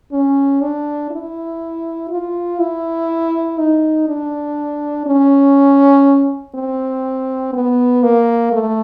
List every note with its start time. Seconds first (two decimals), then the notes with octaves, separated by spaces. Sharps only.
0.12 C#4
0.62 D4
1.11 E4
2.10 F4
2.59 E4
3.58 D#4
4.08 D4
5.06 C#4
6.55 C4
7.53 B3
8.03 A#3
8.53 A3